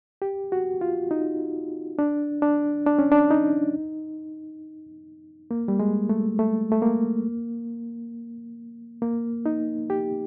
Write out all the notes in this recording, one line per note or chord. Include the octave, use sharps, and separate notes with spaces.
G4
F#4
F4
D#4
D4
D4
D4
C#4
D4
D#4
A#3
G3
G#3
A3
A3
A3
A#3
A#3
D#4
G4